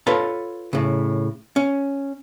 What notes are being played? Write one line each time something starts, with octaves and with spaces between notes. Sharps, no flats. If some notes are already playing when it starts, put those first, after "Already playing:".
F4 A4 B4 C#5 A5
A2 C#3
C#4